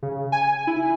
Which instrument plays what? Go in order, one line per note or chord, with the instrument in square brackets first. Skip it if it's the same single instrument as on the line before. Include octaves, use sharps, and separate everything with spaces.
[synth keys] C#3
G#5
E4